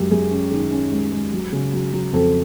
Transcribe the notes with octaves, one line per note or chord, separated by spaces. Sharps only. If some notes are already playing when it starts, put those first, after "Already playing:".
Already playing: F#2 G#3 G4
F#2 G#4
C#4
D#3 G#4
C#4
G#3
G#3
F#3
C#3
F#3
F#3
F2 A4